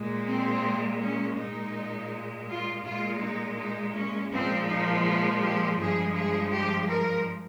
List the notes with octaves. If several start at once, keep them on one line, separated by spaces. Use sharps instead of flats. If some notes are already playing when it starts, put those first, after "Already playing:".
Already playing: A#2 G#3
C4
C#4
A#2 G#3 D#4
F4
A#2 G#3 F4
D#4
D#4
C#4
A#2 F3 G#3 C4
D#4
F4
G4
G2 F3 G#3 G#4
G#4
G4
A#4